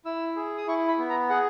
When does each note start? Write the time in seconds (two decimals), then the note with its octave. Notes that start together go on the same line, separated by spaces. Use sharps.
0.05 E4 E6
0.36 G#4
0.58 D#6
0.67 E4 C#6
0.88 B5
0.98 B3
1.10 A#5
1.29 G#4 F#5